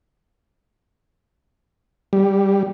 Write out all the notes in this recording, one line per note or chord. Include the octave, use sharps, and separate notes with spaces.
G3